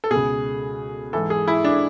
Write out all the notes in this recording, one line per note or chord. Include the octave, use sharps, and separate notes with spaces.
A4
C#2 B2 G#4
G#2 E3 A4
G#4
E4
D4